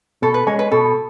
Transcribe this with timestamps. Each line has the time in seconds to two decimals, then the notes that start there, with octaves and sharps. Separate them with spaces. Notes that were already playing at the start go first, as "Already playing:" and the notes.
0.22 B2 A4
0.34 B4
0.47 G#3 C#4 C#5
0.59 B4
0.71 B2 A4